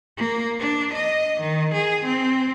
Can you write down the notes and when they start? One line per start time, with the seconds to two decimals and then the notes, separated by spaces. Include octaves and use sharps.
0.17 A#3
0.59 D4
0.93 D#5
1.40 D#3
1.73 G#4
2.04 C4